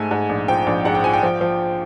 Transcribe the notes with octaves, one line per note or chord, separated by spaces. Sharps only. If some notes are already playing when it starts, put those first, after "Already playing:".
Already playing: G#2 A3 G#5
G#2
A#1
F3 G5
A#1
G#2 F#5
G5
F3 G#5
G5
F3
F3